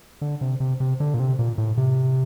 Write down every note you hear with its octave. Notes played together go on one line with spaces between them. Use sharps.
D3
C3
C3
C3
D3
A#2
C3
A#2
A2
C3